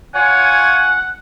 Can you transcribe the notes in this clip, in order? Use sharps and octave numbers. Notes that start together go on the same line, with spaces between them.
F4 C#5 F#5 G#5